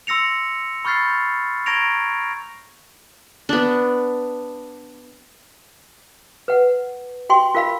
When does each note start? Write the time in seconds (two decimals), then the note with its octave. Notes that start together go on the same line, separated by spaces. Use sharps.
0.07 C6 E6 A#6 C#7 F7
0.85 B5 C#6 F6 G6 A6 C7
1.66 A#5 C#6 G#6 A#6 D7 F7
3.49 B3 D4
6.48 B4 F#5
7.30 F#4 G5 C6 C#6
7.55 F4 A#4 F5 B5